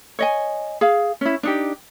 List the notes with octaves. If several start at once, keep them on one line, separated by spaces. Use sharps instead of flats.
C#5 D#5 G#5
G#4 F5
C#4 E4
D4 D#4 G4